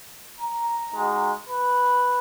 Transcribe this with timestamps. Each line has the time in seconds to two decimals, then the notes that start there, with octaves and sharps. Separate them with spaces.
0.39 A#5
0.94 G#3 D#4 F#4
1.49 B4